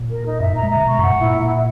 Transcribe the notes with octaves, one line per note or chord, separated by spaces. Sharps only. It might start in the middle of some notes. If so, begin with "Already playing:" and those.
Already playing: A#2
A#4
D#4
F#2 E5
A#2 A#5
G#3
C#3 A#5
B2 C#6
F#2 F#5
G#2
A#2 E4